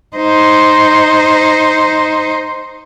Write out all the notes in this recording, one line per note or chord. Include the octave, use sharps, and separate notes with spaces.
D#4 C5